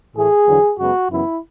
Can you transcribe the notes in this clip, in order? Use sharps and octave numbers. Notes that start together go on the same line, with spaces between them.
A2 E3 A3 G#4
E2 D3 F#3 B3
F#2 C#3 G#3 B3 F#4
F#2 C#3 E3 B3 E4